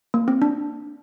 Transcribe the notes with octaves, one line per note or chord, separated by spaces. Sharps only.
A#3
C4
D4